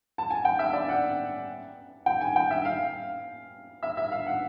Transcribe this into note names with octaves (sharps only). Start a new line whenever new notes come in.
A5
G#5
G5
E5
D5
F#5
G5
G#5
G5
E5
F5
E5
E5
F5
F#5